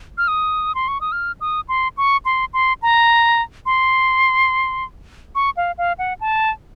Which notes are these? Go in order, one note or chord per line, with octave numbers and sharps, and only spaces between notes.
F6
D#6
C6
C#6
D#6
F6
D#6
C6
C#6
C6
C6
A#5
C6
C#6
F5
F5
F#5
A5